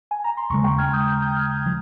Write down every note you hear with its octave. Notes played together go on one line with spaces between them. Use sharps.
G#5
A#5
C6
D#2 C#3 G#3 A#5 C#6
G5 A#5
F6 G#6
D#6 G6
D#6 G6
D#6 G6
F6 G#6
D#6 G6
F3